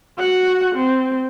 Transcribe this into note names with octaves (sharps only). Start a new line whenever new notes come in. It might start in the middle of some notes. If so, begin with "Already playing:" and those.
F#4 F#5
C4